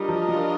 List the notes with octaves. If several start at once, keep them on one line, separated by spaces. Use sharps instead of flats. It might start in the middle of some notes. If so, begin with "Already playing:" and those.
Already playing: G3 D4 F4 A#4 D#5
F3
G3